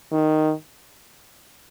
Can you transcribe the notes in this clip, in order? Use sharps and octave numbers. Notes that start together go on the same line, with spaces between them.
D#3